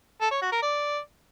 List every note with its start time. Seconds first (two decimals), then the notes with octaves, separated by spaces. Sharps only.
0.21 A4
0.32 C#5
0.42 F#4
0.52 A#4
0.62 D5